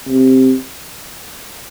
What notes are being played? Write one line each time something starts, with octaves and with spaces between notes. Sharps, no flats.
C3